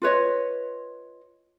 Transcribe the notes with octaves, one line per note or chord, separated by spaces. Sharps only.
F4 B4 C#5 D#5